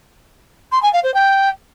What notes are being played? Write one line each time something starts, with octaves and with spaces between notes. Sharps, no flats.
C6
G#5
F5
C5
G5